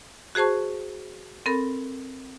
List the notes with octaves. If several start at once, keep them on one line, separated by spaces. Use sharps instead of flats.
F#4 G#4 C5 A5 C#6
C4 A4 A#4 B5